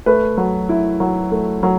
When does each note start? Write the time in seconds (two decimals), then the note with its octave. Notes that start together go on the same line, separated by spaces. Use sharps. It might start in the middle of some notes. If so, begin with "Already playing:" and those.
0.06 A3 B4
0.37 F#3
0.69 E4
1.00 F#3
1.32 A3
1.63 F#3